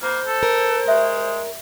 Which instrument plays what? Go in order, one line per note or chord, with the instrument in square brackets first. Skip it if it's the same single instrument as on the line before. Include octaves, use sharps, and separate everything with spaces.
[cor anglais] A#3 [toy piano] F4 [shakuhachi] C5
[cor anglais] A4
[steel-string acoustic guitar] A#4
[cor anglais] G#3 [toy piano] G4 D5 E5